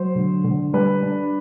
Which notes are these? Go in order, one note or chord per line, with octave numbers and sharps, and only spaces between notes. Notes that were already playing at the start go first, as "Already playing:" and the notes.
Already playing: F#3 C5
D3
D3
G3 B4
D4